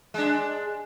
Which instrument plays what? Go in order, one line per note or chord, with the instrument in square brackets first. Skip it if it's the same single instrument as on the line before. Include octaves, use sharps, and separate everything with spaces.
[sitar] G#3 D4